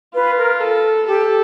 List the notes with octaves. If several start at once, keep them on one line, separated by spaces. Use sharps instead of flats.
F4 B4
A#4
A4
G4 A4